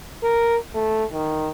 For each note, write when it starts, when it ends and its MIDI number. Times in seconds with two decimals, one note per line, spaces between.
0.23 0.56 70
0.75 1.04 57
1.12 1.50 51